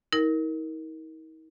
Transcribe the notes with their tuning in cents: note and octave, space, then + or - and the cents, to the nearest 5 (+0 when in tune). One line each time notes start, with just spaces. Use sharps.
D#4 +45 A#4 +0